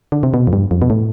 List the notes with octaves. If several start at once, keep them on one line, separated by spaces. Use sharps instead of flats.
D3
C3
B2
F2
G2
F2
B2
A2